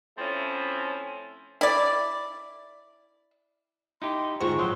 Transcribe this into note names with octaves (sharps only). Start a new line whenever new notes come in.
F3 A3 C4 C#4 E4
E4 D5
D#4 E4 G4 C6
D2 G#2 F4 F#4 G#4 C5 C#6
A1 F3 F#3 C6